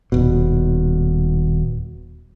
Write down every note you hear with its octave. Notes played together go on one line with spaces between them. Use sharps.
D#1 B2